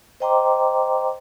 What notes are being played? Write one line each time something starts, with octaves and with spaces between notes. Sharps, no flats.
C5 D#5 G5 A#5 C6 D6